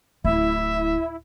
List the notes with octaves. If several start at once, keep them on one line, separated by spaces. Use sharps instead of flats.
D1 E4 E5